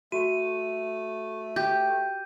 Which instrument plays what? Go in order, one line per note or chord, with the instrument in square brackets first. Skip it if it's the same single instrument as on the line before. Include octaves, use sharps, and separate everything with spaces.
[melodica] A3 [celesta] F#4 [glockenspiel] D#7
[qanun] G4 [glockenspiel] G6